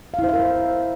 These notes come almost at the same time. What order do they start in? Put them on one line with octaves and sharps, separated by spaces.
F5 E4 C5 E5 A#4